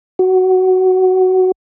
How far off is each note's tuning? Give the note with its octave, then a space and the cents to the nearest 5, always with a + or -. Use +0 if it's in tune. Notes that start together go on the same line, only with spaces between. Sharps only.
F#4 +10